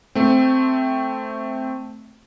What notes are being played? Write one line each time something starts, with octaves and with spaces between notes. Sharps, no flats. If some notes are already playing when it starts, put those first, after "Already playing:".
A3 C4